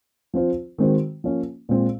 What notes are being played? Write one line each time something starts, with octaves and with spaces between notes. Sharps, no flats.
F3 C4 F4 C5
D#3 G#3 C4 F#4 C5
F3 A#3 C#4
A#2 G#3 C4